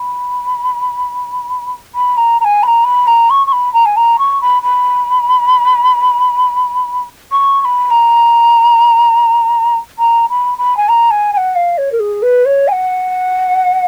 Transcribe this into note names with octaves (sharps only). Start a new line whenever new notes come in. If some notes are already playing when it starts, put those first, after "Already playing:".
Already playing: B5
B5
A#5
A#5
G#5
B5
A#5
B5
A#5
C#6
C#6
B5
A#5
G#5
A#5
C#6
B5
B5
C#6
C#6
B5
A#5
A#5
B5
B5
G#5
A#5
G#5
G#5
F#5
F5
C#5
A#4
G#4
B4
C#5
G#5
F#5